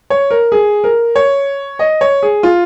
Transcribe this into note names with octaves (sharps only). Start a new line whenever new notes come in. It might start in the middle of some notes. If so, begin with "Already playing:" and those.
C#5
A#4
G#4
A#4
C#5
D#5
C#5
G#4
F4